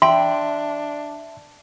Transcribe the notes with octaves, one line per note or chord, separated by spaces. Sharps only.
D4 E5 G5 C6